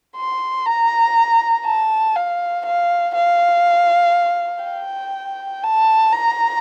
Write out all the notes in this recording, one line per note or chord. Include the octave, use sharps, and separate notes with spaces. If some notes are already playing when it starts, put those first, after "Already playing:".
C6
A#5
A5
F5
F5
F5
G5
A5
A#5